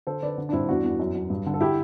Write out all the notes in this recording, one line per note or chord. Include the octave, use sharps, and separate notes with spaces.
D3 A4 C5
D3 B4 D5
D3
D4
G2 C4 E4
E2 D4 F#4
E2
F#2
F#2
G2
D3
A4
E4 G4